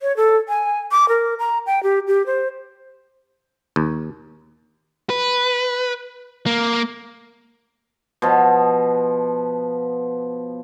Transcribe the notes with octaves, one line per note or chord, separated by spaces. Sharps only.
C#5
A4
G#5
D6
A#4
A#5
G5
G4
G4
C5
D#2
B4
A#3
B2 F3